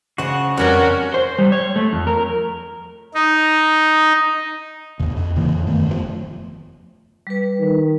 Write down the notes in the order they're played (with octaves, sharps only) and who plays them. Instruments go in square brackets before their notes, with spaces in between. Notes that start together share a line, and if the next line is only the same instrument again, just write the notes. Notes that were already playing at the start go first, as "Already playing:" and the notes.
[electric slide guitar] C#3 F#4 [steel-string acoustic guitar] C5 C#5 D#5
[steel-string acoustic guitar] F2 E3 D4 [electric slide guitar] G3 [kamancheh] C#4 A#4 [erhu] F#4
[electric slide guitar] C5
G3
C#5
A3
F2
A#4
[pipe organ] D#4
[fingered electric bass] D#2 C3
F2
D1 C#3 E3 A#3
F2
F#2 D#3 A3 B3
F1 B2 F3
[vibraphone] G3 B4
[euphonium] D#3